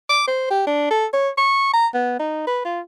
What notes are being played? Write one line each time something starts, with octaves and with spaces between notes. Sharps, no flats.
D6
C5
G4
D4
A4
C#5
C#6
A#5
B3
D#4
B4
F4